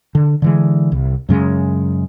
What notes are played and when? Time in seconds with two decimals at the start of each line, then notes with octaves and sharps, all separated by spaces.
0.15 D3
0.42 D3 E3 G#3
0.92 C2
1.29 F#2 C#3 G#3